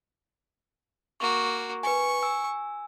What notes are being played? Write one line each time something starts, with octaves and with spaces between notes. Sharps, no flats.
A#3 F#4 C#6
B4 G#5 C#6
G#5 E6